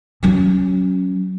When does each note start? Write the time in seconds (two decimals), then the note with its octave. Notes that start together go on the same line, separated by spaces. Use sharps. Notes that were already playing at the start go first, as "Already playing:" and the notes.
0.23 F#3 C#4